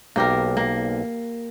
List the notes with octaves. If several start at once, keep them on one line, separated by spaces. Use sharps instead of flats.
B1 A#3 G4 A#4
A#3